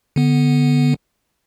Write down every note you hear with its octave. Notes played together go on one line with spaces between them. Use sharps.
D3 B3